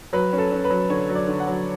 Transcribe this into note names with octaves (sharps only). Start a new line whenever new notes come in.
F#3 B4
C#4
A4
C#4
B4
F#3
D3 C#5
F#3
D5
D3
F#5
F#3